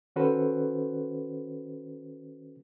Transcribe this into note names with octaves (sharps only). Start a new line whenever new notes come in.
D#3 C#4 F#4 A4 B4 C5